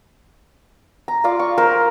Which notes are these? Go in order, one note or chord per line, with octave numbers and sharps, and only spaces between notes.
A#5
F4 D5 F5
C#6
A#4 C5